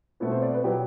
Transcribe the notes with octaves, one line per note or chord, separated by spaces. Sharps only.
B2 A3 C4 B4
C5
D5
B4
B2 F#3 B3 G4